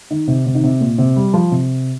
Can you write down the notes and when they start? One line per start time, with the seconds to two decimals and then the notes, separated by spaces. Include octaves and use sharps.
0.11 D#3
0.28 C3
0.46 C3
0.55 D#3
0.63 C3
0.80 A#2
0.98 C3
1.16 G3
1.34 F3
1.52 C3